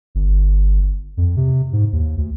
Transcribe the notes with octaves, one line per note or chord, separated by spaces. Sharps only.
G1
F2
C3
G#2
D#2
D2